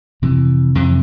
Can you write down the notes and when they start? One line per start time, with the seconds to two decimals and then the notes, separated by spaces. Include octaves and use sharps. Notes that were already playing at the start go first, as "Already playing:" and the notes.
0.22 F2 C3 E3
0.75 F2 C3 E3